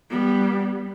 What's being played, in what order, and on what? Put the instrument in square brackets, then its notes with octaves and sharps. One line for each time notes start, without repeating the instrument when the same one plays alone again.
[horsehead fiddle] G3 B3